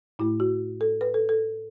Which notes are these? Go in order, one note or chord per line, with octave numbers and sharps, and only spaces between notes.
A2 A3 E4
F#4
A4
B4
A4
A4